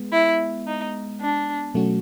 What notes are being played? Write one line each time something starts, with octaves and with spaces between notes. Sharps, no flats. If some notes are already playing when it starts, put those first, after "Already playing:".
Already playing: G#3 B3
E4
D#4
D4
B2 F#3 A3 C#4 F#4